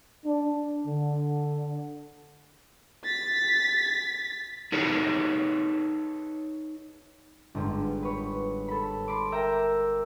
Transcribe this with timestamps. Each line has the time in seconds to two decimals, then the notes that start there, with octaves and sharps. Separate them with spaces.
0.25 D4
0.86 D3
3.04 A6 B6
4.72 D#4 G#4 A4 B4 C#5
7.55 G1 G#2
8.03 B4 C#5
8.68 A4 B5
9.08 B5 C6 D6
9.32 A#4 E5 G5 A#5